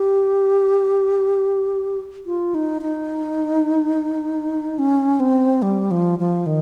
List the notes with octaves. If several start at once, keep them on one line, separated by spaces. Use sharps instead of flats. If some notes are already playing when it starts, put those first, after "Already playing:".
Already playing: G4
F4
D#4
D#4
C#4
C4
G3
F3
F3
D#3